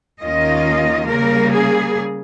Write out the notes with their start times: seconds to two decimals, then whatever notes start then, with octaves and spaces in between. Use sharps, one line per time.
0.20 D#2 D#3 A#3 C#4 F4 D#5
1.07 C#3 G3 A#3 A#4
1.52 G#4